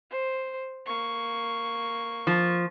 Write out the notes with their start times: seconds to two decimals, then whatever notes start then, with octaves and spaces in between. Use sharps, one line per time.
0.10 C5
0.86 A#3 C#6
2.27 F3